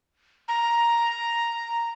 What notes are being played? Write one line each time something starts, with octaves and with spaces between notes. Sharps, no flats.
A#5